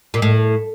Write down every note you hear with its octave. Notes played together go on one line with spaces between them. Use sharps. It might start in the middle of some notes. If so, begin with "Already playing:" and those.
A#2
A2